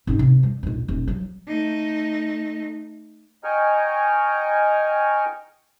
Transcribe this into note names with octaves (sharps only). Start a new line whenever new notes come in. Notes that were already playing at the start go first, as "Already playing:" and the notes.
G#2 C#4
C3 D#3
G3 A3
A#1 D#2
D#1 F#2
F3 F#3
A3 D#4
D#5 G5 G#5 A#5 C#6 F6